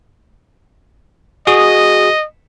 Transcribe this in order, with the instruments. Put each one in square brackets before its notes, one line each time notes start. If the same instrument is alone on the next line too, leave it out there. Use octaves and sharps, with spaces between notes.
[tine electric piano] F#4 G#4 D#6 [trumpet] D#5